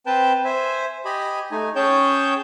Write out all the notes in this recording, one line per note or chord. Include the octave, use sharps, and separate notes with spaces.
C4 B4 G5 A5
C5 E5 G#5
G4 D#5 G#5 B5
A3 D#4 G#5
C#4 G#4 C#5 G5 A5 G6